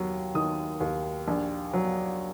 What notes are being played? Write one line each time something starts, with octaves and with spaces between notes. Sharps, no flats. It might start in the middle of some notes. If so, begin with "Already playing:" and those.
Already playing: D#2 F#3
D#3 D#6
D#2
A#1
F#3